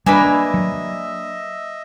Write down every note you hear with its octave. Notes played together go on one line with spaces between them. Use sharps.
G3 A#3 D4 B4 D#5 E5 G#5
F#3